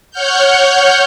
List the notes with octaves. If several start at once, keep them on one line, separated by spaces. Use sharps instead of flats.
C#5 F#5 F6 G6